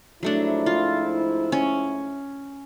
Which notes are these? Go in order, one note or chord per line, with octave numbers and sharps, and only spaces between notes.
G#2 F3 F#3 A3 D4 E4
F4
C#4